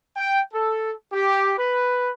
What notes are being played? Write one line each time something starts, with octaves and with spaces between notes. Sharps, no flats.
G5
A4
G4
B4